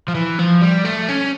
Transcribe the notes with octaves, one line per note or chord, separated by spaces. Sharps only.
F3
E3
F3
G3
A3
C#4